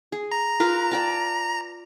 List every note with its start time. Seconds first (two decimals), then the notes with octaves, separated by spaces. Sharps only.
0.12 G#4
0.32 A#5
0.60 F4 A#4 B4
0.91 D5 G5 A5